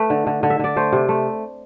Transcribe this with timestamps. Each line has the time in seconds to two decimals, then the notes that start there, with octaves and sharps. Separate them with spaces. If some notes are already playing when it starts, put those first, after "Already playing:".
Already playing: A3 B4
0.10 D3
0.27 D3
0.43 D3
0.50 E5
0.59 D3 D5
0.76 A3 C5
0.92 C3
1.09 A3